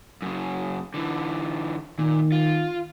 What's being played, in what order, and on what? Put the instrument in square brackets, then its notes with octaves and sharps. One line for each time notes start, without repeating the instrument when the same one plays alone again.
[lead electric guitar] F#2 C#3
D3 E3
[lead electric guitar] A#2 [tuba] D#3
[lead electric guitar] F4